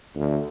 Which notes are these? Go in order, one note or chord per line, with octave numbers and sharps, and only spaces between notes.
D2